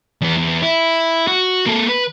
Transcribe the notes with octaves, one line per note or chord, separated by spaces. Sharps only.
E2 B3
E2
E4
F#4
A#3 A4
B4